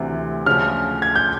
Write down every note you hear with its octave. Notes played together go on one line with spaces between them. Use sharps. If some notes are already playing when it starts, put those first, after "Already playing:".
Already playing: D2 C3 E3
D2 C#3 F3 F6
G#6
G6